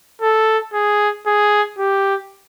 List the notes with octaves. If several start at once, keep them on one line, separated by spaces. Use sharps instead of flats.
A4
G#4
G#4
G4